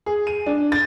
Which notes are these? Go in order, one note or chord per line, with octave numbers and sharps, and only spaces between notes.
G#4
D#7
D4
A6